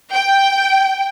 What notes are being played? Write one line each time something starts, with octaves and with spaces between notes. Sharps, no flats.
G5